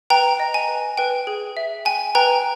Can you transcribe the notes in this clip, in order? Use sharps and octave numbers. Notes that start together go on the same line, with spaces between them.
B4 G5 A#5
D#5
G#5
B4
B4 G5
G#4
E5
G5 G#5
B4 G5 A#5